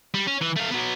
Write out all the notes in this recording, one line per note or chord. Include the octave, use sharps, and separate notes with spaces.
G3
C#4
E3
A3 F5
F#3 B3